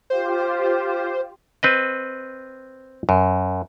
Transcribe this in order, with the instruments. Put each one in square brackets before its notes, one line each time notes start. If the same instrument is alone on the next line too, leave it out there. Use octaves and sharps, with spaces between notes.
[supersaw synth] F4 G4 [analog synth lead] C5
[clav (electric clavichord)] C4 B4 D#5
F#2